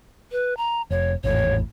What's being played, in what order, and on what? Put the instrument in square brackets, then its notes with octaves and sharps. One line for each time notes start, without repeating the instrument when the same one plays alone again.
[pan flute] B4
A#5
[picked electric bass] F1 [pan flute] C#5
[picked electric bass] G#1 E2 A2 [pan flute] C#5